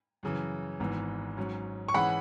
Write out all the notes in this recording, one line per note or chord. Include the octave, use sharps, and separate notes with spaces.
F#2 C#3 E3
G#1 G#2 E3 B3
G#2 F#3 C#4
C#6
G#2 E3 C#4 G#4 F#5 B5